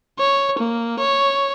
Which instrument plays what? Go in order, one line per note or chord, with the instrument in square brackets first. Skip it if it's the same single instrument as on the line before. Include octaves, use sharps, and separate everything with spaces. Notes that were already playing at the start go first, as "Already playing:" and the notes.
[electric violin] C#5
A#3
C#5